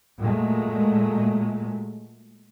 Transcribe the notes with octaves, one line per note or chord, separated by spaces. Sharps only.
A#2 F#3 G#3 A3